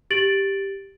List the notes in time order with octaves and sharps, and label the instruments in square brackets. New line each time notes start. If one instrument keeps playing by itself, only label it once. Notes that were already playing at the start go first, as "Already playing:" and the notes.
[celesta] G4 A6 D7 F#7